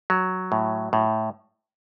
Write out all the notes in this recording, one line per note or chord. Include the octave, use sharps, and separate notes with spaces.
F#3
A2
A2